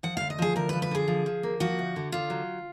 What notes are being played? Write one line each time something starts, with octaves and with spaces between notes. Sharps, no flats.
F3 F#5
D2 F5
D#5
F3 G#4
D2 A#4
F3 B4
B4
D3 G#4
F3
F3
A#3
F3 F#4
D2
D3
D3 F4
F#3